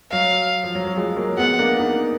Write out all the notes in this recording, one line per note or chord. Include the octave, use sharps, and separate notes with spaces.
F#3 F5
F3
F#3
F#3
F3 G#3
F#3 A#3
G#3 B3 F#5
A#3 D4
B3 D#4